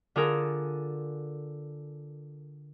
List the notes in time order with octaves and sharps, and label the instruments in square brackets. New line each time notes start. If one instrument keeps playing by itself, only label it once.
[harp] D3 F4 G#4 A#4